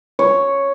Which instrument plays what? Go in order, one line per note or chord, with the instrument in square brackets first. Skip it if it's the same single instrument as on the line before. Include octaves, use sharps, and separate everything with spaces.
[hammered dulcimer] C#5